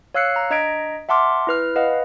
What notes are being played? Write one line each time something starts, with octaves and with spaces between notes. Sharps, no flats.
C#5 F5 E6 F#6 C7 C#7
A#5
D4 D#5 A#5 G#6 B6 D7
E5 F#5 A5 C6 D6 F6
E4 B4 F6
B4 D#5 F5 F#5